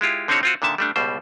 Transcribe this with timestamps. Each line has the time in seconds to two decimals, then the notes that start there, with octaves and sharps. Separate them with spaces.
0.01 G#3 E4 F4 G4
0.28 D3 C4 C#4 D#4 F#4 C#5
0.43 C4 F4 F#4
0.62 A#2 D3 D#3 E5 A5
0.78 G3 A3 D4
0.96 C#2 B2 G3 C5